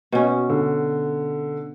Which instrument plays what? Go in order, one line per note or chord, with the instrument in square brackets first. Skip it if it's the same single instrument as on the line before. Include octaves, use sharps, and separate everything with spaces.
[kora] B2 C#4
[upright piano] D3